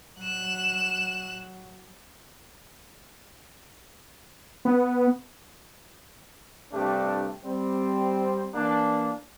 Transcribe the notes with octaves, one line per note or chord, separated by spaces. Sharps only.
F#3 F#6 E7
B3
G2 C3 A3 D4 G4
G3 C4
E3 A#3 D4